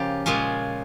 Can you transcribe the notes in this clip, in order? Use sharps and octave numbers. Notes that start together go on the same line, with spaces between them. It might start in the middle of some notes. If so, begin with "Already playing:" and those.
Already playing: C#3 F3 A#3 F4 G4
A#2 G#3 C#4 F4